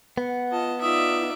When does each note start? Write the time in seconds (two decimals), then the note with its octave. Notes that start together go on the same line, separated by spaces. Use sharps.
0.18 B3 F#5
0.52 F4 D#5 A5
0.81 D#4 F4 D5 E5 D#6